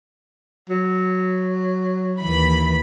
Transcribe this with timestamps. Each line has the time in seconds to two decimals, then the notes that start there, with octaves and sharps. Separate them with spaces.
0.70 F#3
2.21 D#2 E3 B5